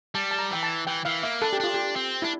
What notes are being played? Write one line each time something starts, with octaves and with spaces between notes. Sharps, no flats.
G3 A5
A5
A#5
E3 G5
A5
E3 G5
E3 F5
A#3 E5
D4 A4
G4
D4 F4
G4
C4
D4 E4